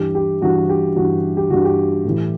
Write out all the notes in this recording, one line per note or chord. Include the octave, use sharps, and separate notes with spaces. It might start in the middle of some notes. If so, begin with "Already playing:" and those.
Already playing: G2 E3 G4
G4
G2 E3 F#4
G4
G2 E3 F#4
G4
G2 E3 F#4
G4
A2 E3